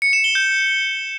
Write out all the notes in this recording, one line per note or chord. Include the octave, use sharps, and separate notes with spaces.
C#7
E7
G7
G6